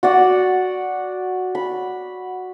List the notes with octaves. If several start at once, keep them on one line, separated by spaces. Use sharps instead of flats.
F#4 D5 F#5
B5